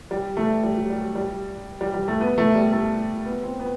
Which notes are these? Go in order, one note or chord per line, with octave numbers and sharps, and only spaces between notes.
G3
A3
G3
F#3
G3
G3
G3
G3
A3
B3
A3
G3
A3
B3
C4
B3